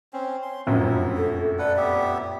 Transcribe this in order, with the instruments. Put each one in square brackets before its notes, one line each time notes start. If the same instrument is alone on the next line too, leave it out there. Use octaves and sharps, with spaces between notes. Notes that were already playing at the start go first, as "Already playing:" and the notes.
[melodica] C4 C#4
C6
[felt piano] F1 A#1 F#2 [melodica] B3 E5
[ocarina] A4
[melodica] A4 B4 F#5 [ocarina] D5
[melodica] B3 G4 E5